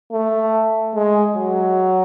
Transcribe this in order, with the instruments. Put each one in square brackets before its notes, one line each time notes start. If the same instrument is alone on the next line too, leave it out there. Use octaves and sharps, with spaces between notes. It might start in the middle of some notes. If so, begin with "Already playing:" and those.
[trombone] A3
G#3
F#3